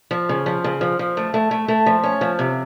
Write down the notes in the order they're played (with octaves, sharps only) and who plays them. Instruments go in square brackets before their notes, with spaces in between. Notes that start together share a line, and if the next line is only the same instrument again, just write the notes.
[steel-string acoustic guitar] F3
C#3
F3
C#3
F3
F3
A3
A3
A3
A3
F3
C#4
F3
C3